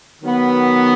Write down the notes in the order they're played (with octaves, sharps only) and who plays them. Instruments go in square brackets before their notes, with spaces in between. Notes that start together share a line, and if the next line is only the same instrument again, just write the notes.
[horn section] D#3 F#3 B3